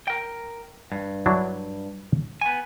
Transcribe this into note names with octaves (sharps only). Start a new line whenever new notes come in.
A#4 G5
G2
F#3 D4 E4
B3 G#5